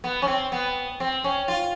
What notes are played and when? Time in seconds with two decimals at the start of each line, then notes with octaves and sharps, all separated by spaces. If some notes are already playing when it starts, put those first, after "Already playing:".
0.04 B3
0.22 C#4
0.28 C4
0.52 B3
1.00 C4
1.24 C#4
1.48 F4